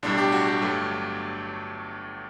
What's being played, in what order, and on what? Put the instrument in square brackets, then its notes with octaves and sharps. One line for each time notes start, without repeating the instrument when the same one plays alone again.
[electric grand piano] B1 A2 G3 D4
G4
F#4
G4
G1 G2 F#3 A3